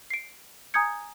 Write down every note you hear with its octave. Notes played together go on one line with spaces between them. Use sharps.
C7 D7
G#5 A#5 D#6 G6 G#6 C#7